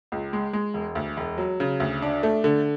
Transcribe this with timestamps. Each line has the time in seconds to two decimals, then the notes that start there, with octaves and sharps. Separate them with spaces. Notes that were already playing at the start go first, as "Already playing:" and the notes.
0.12 C#2
0.33 G#3
0.53 G#3
0.74 E1
0.95 D2
1.17 E1
1.38 F#3
1.60 C#3
1.80 D2
2.02 D4
2.23 A3
2.44 D3